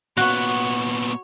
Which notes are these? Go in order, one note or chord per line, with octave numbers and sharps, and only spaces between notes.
A#2 B3 F#4 C#5